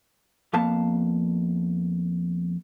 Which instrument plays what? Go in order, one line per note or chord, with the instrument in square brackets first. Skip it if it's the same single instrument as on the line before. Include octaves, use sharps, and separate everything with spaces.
[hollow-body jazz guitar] F2 A#3 B3 F5 A5